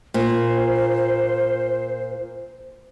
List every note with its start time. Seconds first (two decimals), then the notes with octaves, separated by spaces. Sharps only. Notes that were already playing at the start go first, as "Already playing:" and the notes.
0.14 A#2 C5